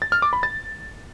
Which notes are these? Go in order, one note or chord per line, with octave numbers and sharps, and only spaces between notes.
A6
F6
D6
B5
A6